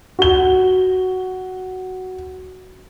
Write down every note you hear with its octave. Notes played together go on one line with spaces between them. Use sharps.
F#4 G7